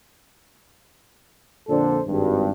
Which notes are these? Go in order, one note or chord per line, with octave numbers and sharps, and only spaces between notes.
F2 A#2 D3 D4 A4 C5
G#1 G2